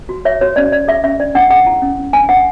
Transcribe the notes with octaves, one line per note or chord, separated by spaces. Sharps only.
F#4
C#5 E5
F#4 C#5
C#4 D5
C#4 D5
G#4 E5
C#4 E5
D4 D5
D4 F#5
G#4 F#5
E4
C#4
C#4
D4 G#5
D4 F#5